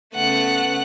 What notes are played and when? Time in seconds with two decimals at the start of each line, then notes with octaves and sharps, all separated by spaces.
0.15 C#3 A3 B3 F#5 F#6